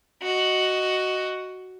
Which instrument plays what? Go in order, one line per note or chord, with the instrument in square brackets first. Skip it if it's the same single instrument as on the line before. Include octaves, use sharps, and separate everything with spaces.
[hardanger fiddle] F#4 D#5